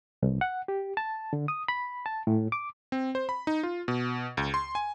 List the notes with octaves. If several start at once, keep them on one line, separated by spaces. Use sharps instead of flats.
C2
F#5
G4
A5
D3
D#6
B5
A5
A2
D6
C4
C5
B5
D#4
F4
B2
C#2
C6
G#5